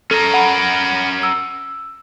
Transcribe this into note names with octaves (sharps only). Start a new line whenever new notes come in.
C#4 A4 A#4
F#5 B5
E6